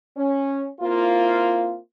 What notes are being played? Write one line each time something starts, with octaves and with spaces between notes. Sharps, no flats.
C#4
A#3 C4 E4 F4